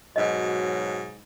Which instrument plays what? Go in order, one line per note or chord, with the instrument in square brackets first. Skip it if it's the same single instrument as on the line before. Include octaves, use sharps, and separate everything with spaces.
[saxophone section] G#2 B2 F#3 [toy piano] D#5